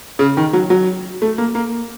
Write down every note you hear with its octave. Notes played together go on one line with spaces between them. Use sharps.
C#3
D#3
F#3
F#3
A3
A#3
A#3